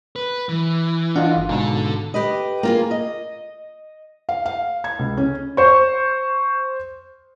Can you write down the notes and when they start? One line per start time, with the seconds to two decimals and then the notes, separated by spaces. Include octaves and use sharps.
0.16 B4
0.49 E3
1.16 D4 F4 D#5 F#5
1.36 G1
1.49 G#2 B2 D3 A4
2.14 G4 B4 D#5
2.63 A#3 F4 G#4
2.91 D#5
4.29 F5
4.46 F5
4.84 G#6
4.99 C#2
5.17 C#4
5.57 C5 C#6